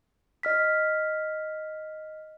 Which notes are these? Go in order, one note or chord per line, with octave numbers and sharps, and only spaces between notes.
D#5 F6 B6